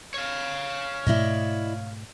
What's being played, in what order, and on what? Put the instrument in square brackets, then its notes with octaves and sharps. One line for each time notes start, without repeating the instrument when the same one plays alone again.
[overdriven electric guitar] C#5 F5
[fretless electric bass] G#2 B2 A3 [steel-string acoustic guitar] E4 D5 D#5